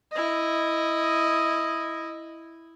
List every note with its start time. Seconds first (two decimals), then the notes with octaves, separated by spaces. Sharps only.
0.12 E4 D#5